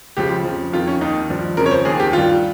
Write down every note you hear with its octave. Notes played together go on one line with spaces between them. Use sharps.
C#2 C#3 F3 G4
F2 C#3 F3
F2 D#3 F4
C#4
D#2 D#3 D#4
G2 F3
F2 C#3 F3 A#4
C#5
C5
D#2 D#3 G#4
G4
G2 D#3 F4